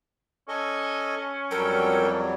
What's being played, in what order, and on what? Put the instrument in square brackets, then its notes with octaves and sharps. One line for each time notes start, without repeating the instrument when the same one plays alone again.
[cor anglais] C#4 [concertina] A4 D#5 G#5
[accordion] F2 F#3 G3 [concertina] A4 G5 [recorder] A#4